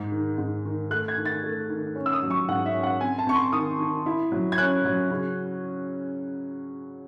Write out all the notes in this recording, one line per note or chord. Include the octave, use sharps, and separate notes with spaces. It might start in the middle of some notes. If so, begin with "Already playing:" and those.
Already playing: G#2 G#3
D#3
G#2
D#3
A3 F#6
G#6
D#3
A6
A3
D#3
C#4
E6
D#6
F#3
C#6
G#2 F#5
E5
C#4
F#5
C4 G#5
A5
C4 C#6
C6
D#3 D#6
D#3
E4
F#3
G#6
C#4 F#6
F#3
C#3